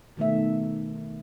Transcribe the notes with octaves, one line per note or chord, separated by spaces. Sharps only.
B2 D#3 A3 E5